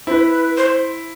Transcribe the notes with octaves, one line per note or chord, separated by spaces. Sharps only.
E4 B4 C5
C5